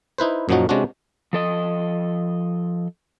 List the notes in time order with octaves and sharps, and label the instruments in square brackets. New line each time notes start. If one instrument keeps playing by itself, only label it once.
[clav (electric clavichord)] D#4 E4 B4 C5
F#2 A#2 F3 F#3 D#4 F#4
C3 G#3 C#4 D4 F#4
[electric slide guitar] F3 A4 D#5